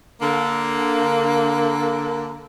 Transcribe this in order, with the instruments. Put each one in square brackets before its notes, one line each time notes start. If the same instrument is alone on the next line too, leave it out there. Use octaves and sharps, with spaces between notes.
[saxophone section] D3 A#3